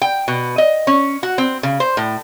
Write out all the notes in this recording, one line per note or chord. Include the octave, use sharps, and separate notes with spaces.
G5
B2
D#5
C#4
F#4
C4
C#3
C5
A2